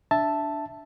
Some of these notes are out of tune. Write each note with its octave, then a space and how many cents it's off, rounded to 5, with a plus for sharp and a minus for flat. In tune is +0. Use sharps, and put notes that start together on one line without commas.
D4 -5 E5 +0 A5 +0